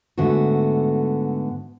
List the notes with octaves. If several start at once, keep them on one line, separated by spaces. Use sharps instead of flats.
G#2 D3 A3 B3 F#4